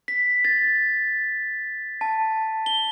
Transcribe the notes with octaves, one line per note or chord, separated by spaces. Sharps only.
B6
A6
A5
G7